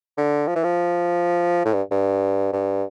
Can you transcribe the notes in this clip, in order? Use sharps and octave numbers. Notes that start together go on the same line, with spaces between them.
D3
F3
E3
F3
A2
G2
G2
G2